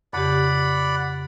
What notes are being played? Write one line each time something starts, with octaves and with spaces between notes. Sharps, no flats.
F2 C#3 G4 D5 F#5 B5